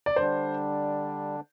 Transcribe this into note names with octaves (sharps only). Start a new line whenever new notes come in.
D5
D3 G3 D4 C5